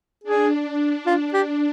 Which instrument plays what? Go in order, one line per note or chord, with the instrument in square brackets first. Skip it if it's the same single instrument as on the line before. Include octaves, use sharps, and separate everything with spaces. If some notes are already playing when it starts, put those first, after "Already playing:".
[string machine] D4 [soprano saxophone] G#4
[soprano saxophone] F4
G4